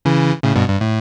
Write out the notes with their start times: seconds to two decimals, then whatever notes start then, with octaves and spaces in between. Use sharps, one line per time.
0.05 C#3 E3
0.44 A2 C#3
0.56 G2 B2
0.68 G2
0.81 A2